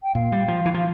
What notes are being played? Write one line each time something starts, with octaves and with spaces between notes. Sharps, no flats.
G5
A#2 F5
G3
F3
E3
F3